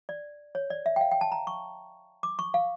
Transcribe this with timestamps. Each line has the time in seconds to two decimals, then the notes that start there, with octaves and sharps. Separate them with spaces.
0.09 D5
0.55 C#5
0.70 D5
0.86 E5
0.96 G5
1.01 F5
1.11 G5
1.21 A5
1.32 A#5
1.47 C#6
2.23 D6
2.39 C#6
2.54 F5